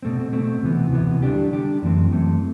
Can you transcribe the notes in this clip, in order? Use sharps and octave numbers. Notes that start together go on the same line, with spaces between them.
B2 A3 C4
B2 A3 C4
D2 C3 E3 B3
D2 C3 E3 B3
D3 G3 D4 G4
D3 G3 D4 G4
F#2 E3 A3 C4
F#2 E3 A3 C4